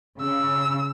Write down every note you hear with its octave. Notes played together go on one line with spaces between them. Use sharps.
C#3 E6